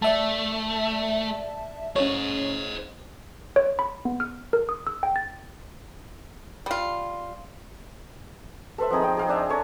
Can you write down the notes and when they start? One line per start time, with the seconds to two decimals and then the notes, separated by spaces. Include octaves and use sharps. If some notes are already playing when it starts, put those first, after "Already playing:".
0.02 A3 D5 E5 A5
1.96 C#4 C5 C#5 D#5
3.56 C#5
3.79 B5
4.05 B3
4.20 F6
4.53 A#4
4.69 D#6
4.87 E6
5.03 G5
5.16 A6
6.66 G3 F4
8.78 A4 B4 C5 E5
8.90 F3 C4 D#4 G#4
9.02 C4 G5
9.17 G#4 F5 G5
9.29 D4 D#5 E5 G#5
9.49 A4 C#5 G#5 A#5